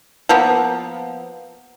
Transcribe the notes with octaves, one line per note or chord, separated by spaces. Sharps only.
F3 A#3 B3